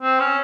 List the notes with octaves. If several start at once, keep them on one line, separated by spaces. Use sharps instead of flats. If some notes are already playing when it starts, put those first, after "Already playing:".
C4
C#4